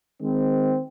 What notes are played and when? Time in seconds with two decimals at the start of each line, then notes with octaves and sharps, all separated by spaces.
0.21 D#3 G#3 C4